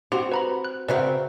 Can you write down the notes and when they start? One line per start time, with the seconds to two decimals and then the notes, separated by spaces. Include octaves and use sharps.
0.12 C4 F#4 G4 C6
0.32 F#4 B4 A#5 B5
0.65 F#6
0.88 C#3 C4 F#4 A#4 B4 D5 E5 F#5